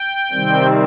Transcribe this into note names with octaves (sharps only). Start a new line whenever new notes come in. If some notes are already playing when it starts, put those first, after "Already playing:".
Already playing: G5
C3 D#3 G3 C4